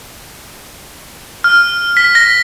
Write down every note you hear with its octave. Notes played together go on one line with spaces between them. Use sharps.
F6
B6
A#6